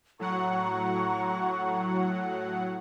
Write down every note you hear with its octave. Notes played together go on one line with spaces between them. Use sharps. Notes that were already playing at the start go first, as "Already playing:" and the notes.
A2 F#3 F#5 A#5 C#6